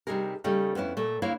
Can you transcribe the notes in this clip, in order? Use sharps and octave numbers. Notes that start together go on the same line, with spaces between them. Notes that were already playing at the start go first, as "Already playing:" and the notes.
C3 G3 D#4 G#4 A#4
C#3 G3 A3 D#4
F2 B3 C#4 E4
A#2 A3
D2 A#3 E4 C#5 F5